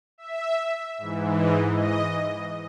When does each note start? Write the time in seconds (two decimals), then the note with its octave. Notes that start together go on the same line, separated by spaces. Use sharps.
0.18 E5
0.98 G#2 E3
1.37 D#5
1.77 D#5